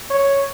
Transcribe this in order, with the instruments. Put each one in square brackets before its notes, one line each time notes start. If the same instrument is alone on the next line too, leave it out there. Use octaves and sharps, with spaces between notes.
[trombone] C#5